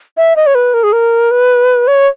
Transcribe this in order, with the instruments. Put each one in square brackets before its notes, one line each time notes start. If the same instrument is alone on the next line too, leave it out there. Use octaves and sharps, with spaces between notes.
[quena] E5
D#5
C#5
B4
A#4
G#4
A#4
B4
C#5